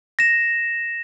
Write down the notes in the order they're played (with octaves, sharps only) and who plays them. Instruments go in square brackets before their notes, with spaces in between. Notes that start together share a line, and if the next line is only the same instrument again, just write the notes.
[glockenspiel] A#6 E7